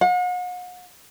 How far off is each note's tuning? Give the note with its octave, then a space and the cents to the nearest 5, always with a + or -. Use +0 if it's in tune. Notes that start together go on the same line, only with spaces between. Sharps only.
F#5 -40